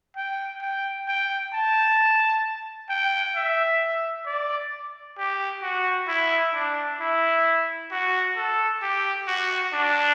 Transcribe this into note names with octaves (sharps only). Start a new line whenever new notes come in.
G5
G5
G5
A5
G5
E5
D5
G4
F#4
E4
D4
E4
F#4
A4
G4
F#4
D4